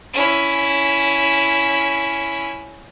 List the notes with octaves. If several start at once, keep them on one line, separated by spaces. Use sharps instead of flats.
C#4 E4